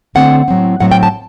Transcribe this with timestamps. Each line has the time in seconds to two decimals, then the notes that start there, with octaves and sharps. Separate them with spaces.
0.15 D3 A3 C4 F#5
0.48 A2 F#3 C4
0.80 A2 F#3 C4 F#5
0.92 G5
1.03 A5